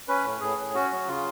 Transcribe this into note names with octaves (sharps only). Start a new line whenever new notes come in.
C#4 B4
A2
A2 G#4
A2
C#4 F#4
F#3
C#3 F4